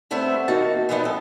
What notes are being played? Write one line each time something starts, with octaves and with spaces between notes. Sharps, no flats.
G3 A3 B3 C4 C5 E5
D#3 A#3 D#4 F#4 A5
E3 F3 G3 B3 D#4
A4